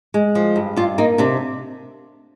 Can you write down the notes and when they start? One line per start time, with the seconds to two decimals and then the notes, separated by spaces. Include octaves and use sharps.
0.14 G#3
0.35 F3
0.56 G2
0.76 G2 F4
0.98 A#3 D#4
1.18 C3 D4